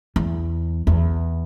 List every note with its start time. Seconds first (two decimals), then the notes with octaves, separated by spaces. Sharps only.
0.16 E2
0.87 E2